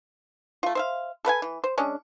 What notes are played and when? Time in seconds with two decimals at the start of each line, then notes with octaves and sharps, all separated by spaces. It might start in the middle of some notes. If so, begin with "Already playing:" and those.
0.63 A3 F4
0.75 C5 E5 F5
1.25 A4 B4 F#5 G#5
1.42 E3
1.64 C5
1.78 G#3 C#4 D4